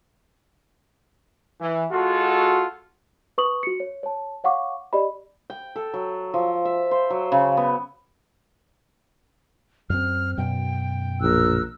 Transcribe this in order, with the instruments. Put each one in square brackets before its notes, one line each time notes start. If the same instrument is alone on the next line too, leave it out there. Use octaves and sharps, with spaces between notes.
[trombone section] E3
[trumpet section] G#3 F4 A4 [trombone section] F#4
[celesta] B4 C#6 D#6 F#7
F#4 C#7
C#5
C#5 A5
C#5 F5 F#5 C#6 D6
G4 D5 D#5 B5
[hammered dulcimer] G5
A4
F#3
F3
E5
C5
F#3
C#3
B3
[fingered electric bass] F#2 C4 [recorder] F6
[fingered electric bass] F#2 B2 [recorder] G5
[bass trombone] A#1 [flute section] A#4 E6 F#6